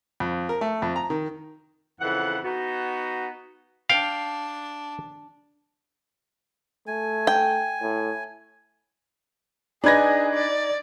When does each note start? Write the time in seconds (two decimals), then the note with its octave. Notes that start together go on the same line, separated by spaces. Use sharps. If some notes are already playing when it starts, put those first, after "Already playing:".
0.20 F2
0.49 A#4
0.61 A3
0.82 F2
0.96 A#5
1.10 D#3
2.01 F2 C#3 E3 F#5
2.44 B3 D#4 F#4
3.90 D4 F5 G5
6.87 A3 G#5
7.27 G5
7.82 A2
9.84 D4 D#4 G#4 B4 G#6 A#6
10.34 D5